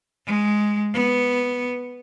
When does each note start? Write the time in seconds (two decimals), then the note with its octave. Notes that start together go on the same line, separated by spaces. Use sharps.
0.26 G#3
0.93 B3